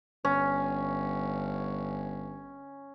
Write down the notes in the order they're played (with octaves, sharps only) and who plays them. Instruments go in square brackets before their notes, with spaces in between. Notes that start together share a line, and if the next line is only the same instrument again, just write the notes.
[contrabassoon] G1 [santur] C#4